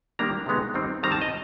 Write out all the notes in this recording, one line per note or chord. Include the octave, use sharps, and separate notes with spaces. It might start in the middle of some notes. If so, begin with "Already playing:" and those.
D#3 G3 A#3 D4 A#5
C3 D#3 G#3 B3 D#4
D#3 G3 C4 D#4
D#3 G3 C4 A#5
A5
D#5